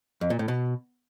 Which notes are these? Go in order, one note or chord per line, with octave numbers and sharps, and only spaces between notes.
F2
A#2
A2
B2